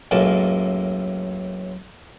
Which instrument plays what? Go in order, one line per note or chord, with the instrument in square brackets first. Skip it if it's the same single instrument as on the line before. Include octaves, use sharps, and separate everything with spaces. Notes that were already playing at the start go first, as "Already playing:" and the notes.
[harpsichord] C#2 F#2 A2 A#3 A5